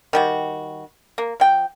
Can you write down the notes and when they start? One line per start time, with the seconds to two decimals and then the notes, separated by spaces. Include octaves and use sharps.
0.13 D#3 G3 F#4
1.18 A#3
1.40 F3 G5